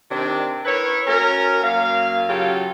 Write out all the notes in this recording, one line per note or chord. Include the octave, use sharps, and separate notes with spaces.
C3 D#3 D4
E4 A#4 B4 C#5
C#4 F#4 A#4
F#2 A#3 F5
C#3 F#3 F4 G4 A4